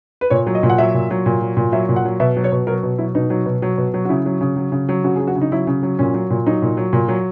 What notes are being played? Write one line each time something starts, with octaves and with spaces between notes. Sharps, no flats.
B4
A#2 C#5
F#3
D#5
A#2
F#5
F#3 E5
A#2
F#3
A#2
F#3
A#2
F#3 E5
A#2
F#5
F#3
B2 E5
F#3
C#5
B2
F#3 A#4
B2
F#3 E4
B2 D#4
F#3
B2
F#3
B2
F#3
F#4
C#3 E4
F#3
C#3
F#3
C#3
F#3
C#3 F#4
F#3 G#4
F#4
C#3
D#4
F#3 E4
C#3
F#3
A#2 C#4
F#3
A#2
F#3 D#4
A#2
F#3
A#2
F#3